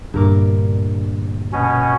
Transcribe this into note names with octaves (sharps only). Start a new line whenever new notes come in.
D2 G2 A#2 A#4 D6
B2 C#4